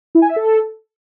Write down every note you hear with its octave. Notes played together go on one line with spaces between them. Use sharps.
E4
G#5
E5
A4